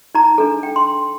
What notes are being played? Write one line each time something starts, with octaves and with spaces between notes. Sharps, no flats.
D#4 A#5
D4 A4
G5
C6